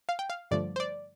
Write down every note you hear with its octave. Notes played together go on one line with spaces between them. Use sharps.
F5
G5
F5
G2 D3 F3 A3 D5
C5
D5